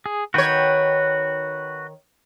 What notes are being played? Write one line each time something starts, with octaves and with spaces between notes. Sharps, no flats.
G#4
D#3 F#4 B4 C#5 G5